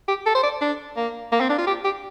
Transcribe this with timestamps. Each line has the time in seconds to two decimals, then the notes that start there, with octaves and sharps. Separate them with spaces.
0.09 G4
0.26 A4
0.35 C5
0.43 D5
0.61 D4
0.97 A#3
1.32 A#3
1.41 C4
1.50 D4
1.59 F4
1.67 G4
1.85 G4